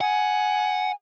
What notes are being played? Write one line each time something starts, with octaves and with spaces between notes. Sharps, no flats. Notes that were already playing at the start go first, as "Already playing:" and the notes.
F#5 G#5